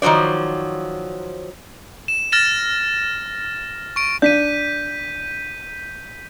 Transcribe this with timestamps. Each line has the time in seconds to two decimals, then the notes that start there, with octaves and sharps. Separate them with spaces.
0.02 D#3 F3 F#3 C5 D5
2.08 E7
2.32 F6 A6 A#6 E7
3.96 C#6 D7
4.22 D4 G6 B6 D#7